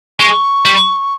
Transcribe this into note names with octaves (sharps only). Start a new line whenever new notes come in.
G#3 C#6
G3